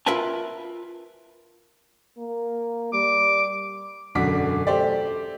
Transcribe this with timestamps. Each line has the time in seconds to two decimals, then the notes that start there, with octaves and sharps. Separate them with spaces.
0.06 F4 A#4 B4 E5 G#5 A5
2.18 A#3
2.93 G3 D6
4.15 E1 F#2 D3 F#4 D6 B6
4.67 A3 G4 C5 D5